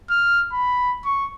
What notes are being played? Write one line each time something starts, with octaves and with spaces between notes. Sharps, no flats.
F6
B5
C#6